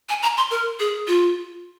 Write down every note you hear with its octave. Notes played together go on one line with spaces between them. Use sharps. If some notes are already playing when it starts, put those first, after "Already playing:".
G#5
A#5
C6
A#4
G#4
F4